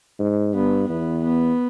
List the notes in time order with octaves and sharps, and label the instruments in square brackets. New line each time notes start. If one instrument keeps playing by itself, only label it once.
[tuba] G#2
[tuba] G2 [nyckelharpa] B3
[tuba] E2 [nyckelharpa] B3
[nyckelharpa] B3